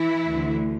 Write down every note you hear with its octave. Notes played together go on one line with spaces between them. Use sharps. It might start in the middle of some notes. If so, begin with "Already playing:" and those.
Already playing: E3 E4
D2 D3